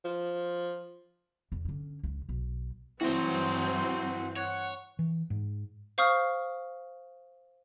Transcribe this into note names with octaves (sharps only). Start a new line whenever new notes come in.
F3
E2
D3 C#4
C#2
B1
G2 E3 F#3 C4 E4 F#4 C5
C#5 F#5
E3
G#2
C5 F5 C#6 D#6 F6